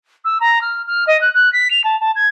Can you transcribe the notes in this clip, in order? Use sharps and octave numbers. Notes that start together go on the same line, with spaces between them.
E6
A#5
F6
F6
D#5
F#6
F#6
B6
F7
A5
A5
G#6